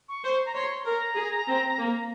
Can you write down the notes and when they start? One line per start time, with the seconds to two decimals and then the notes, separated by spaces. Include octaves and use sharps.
0.09 C#6
0.24 C5
0.46 A#5
0.55 C#5 C6
0.70 C6
0.85 A#4 A#5
1.16 G#4
1.47 C4
1.77 A#3